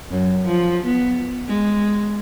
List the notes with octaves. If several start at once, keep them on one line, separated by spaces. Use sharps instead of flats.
F#2
F3
B3
G#3